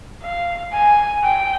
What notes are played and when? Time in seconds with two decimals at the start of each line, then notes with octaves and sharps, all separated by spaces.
0.23 F5
0.73 G#5
1.23 G5